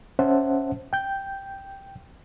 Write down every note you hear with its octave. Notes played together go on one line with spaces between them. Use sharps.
C#4 C5 E5 F#5 A5
G5 G6